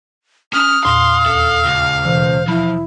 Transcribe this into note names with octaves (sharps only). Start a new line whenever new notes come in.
C#4 D#6 F6
E2 A#2 F5 C6
D#2 A4
C#2
B2 E3 C5
F3 E4 B5